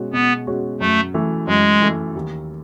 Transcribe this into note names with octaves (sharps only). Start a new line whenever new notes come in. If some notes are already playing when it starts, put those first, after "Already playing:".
Already playing: B2 G#3 C#4 F#4
B2 B3
G#3 C#4 F#4
F#2 A3
E3 A3
F#2 G#3
E3 A3
D#2